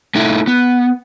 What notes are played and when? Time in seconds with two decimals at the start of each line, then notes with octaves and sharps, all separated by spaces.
0.15 A3 D#4 E4
0.47 B3